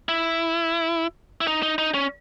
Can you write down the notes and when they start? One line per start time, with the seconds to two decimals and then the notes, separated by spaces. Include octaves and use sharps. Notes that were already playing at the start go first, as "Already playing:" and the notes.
0.09 E4
1.41 E4
1.47 D#4
1.62 D#4
1.78 D#4
1.94 C#4